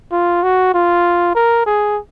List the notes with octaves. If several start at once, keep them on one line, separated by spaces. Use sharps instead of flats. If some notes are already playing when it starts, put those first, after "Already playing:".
F4
F#4
F4
A#4
G#4